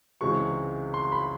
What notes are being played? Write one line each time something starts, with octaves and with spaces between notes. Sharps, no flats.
C#2 C3 E3 G#3 C#6
C6
B5